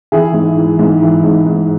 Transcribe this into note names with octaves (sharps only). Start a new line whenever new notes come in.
E3 E4 G#4
G#2
E3
G#2
E3
G#2
G#2